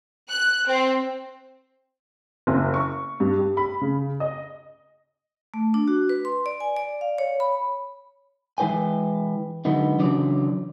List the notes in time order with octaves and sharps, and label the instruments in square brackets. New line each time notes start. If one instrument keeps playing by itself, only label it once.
[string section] F#6
C4
[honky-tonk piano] F#1
C#6
G2
G4
B5
C#3
D#5
[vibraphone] A3
D4
F#4
B4
C6
D5
G#5
D5
F5
C#5
B5
[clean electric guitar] E3 G#3 E4 B4 G5 G#5
D3 F#3 G#3 B3 D#4
C#3 E3 F#3 D4 D5